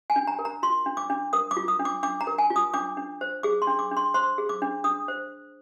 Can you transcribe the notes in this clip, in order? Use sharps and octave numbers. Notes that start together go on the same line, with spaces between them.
G#5
D4
A#5
A#4
A#5
F4 C6
D4
D6
D4
A#4 D#6
D6
F4
D#6
D4
D6
D4 D6
A#5
A#4
G#5
F4
D#6
D4 D6
D4
C5
G#4 D6
C6
D4
D6
D4
C6
C5 C6
G#4
D6
D4
D4 D#6
C5